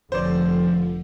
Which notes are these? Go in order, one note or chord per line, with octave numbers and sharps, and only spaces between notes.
F1 D3 F3 C5 D5